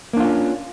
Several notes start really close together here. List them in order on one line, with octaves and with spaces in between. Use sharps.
A#3 D4 F4 C#4